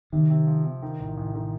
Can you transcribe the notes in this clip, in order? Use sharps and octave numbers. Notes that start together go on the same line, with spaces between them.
C3 D#3
C3
F3
C3
D#3
A1
A1
D#3